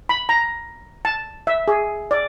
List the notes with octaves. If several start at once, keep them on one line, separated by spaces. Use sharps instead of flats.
B5
A#5
A5
E5
G#4
D5